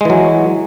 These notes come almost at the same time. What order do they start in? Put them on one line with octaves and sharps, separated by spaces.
G#3 E3 F#3